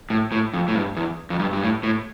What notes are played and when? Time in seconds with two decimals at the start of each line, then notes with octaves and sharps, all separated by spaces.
0.10 A2
0.32 A2
0.53 F2
0.68 A2
0.75 G2
0.96 E2
1.30 F2
1.39 G2
1.53 G2
1.62 A2
1.83 A2